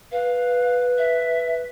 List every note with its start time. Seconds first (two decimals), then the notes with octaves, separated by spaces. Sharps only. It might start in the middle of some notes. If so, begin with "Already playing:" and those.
0.11 B4 F5
0.98 E5